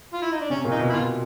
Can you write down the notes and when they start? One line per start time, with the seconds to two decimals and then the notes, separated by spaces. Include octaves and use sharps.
0.13 F4
0.22 E4
0.32 D#4
0.41 D4
0.50 C3 C#4
0.65 A#2
0.72 D#4
0.79 B2
0.90 E4
0.93 B2 F4